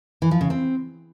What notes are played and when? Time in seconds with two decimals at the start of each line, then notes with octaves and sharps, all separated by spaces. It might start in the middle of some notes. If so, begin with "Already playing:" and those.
0.22 E3
0.31 F3
0.41 C#3
0.50 C4